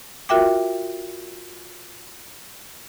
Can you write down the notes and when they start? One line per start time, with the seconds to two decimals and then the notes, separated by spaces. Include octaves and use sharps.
0.29 F4 F#4 A#4 E5 G5 D6